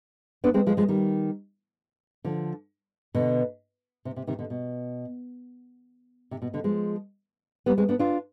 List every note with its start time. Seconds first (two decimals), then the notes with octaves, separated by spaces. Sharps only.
0.44 B3 D4
0.54 G#3 C4
0.67 F3 G#3
0.77 F3 G#3
0.89 D#3 G3
2.24 D3 F3
3.15 B2 D3
4.05 C3
4.16 C3
4.27 C3 D#3
4.39 B2 D3
4.50 B2
6.31 C3
6.42 B2
6.54 B2 D3
6.64 F3 G#3
7.66 G3 B3
7.78 G#3 C4
7.89 B3 D4
7.99 D4 F4